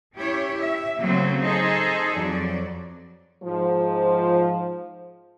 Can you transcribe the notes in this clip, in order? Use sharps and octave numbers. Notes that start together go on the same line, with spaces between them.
C#4 E4 G4 C#5
E5
C#3 F#3 A3 A#3 C4
D#4 G#4 A4 C5
F2 F#3 D5
G#2 F3